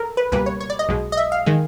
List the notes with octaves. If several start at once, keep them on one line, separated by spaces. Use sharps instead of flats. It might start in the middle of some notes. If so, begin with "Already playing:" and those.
Already playing: A4 A#4
B4
C#2 B2 G3 A#3 B4
C#5
C#5
D5
D#5
B1 B2 G#3
D#5
E5
F5
D#3 G#3